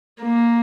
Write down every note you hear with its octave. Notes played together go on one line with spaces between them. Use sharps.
A#3